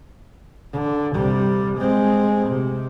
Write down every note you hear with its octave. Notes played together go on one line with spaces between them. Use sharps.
D3
C3 G3
G#3 C4
C3